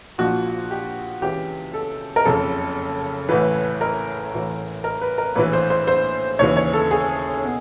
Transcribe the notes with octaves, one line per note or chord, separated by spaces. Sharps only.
A#1 A#2 F3 F#4
G4
C#2 C#3 E3 G4
A4
A#4
F#1 F2 C#3 A4
A1 A2 E3 B4
A#4
A1 A2 E3
A#4
B4
A#4
A#1 A2 E3 B4
C5
C5
C5
D#2 C#3 E3 C#5
C#5
A4
G#4
B2